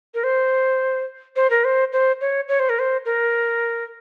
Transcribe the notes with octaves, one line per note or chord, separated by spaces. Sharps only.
A#4
C5
C5
A#4
C5
C5
C#5
C#5
C5
A#4
C5
A#4